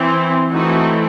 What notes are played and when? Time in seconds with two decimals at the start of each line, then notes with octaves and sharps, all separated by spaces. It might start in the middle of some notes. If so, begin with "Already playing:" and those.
Already playing: E3 C4
0.51 E3 A3 C4 D#4 F#4